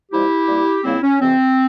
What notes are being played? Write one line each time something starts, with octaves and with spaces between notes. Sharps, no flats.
G2 F3 G#3 E4 G4
G2 G3 A#3
C#2 C#3 G3 A#3 C4 E4
C#4
F2 C3 E3 C4